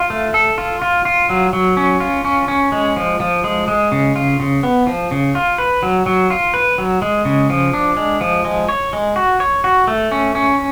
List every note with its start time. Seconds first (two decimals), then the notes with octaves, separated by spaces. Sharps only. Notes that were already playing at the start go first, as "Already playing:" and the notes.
Already playing: F4
0.10 A3
0.34 A4
0.58 F4
0.82 F4
1.05 F4
1.30 F#3
1.53 F#3
1.77 C#4
2.00 F4
2.25 C#4
2.48 C#4
2.72 G#3
2.96 F3
3.20 F3
3.44 G#3
3.68 G#3
3.92 C#3
4.16 F4
4.40 C#3
4.63 B3
4.87 F3
5.11 C#3
5.35 F4
5.58 B4
5.83 F#3
6.06 F#3
6.30 F4
6.54 B4
6.78 F#3
7.02 G#3
7.25 C#3
7.50 F3
7.73 D4
7.97 G#3
8.21 F3
8.45 G#3
8.69 C#5
8.93 G#3
9.16 F#4
9.40 C#5
9.64 F#4
9.88 A3
10.12 C#4
10.35 C#4